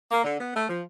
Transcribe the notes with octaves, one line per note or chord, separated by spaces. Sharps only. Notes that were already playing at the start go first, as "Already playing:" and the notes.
A#3
D3
B3
A3
F3